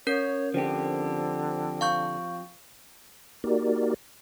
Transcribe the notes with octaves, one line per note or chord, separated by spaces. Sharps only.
C#4 A#4 C#5 G6
D3 F3 C4 G4
F5 C#6 G6
A#3 D#4 F#4 G4 A#4 D5